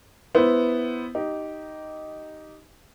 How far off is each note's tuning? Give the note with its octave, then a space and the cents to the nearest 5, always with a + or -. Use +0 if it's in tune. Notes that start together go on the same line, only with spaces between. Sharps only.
B3 +5 E4 +0 C5 +0
D#4 +0 G4 -15